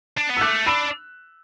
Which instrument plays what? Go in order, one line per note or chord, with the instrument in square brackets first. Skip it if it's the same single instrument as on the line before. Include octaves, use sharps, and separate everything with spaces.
[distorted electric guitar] D4
B3
[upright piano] E6
[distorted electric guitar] A3 [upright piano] D6 F#6
[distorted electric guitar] D4 [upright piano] B5 E6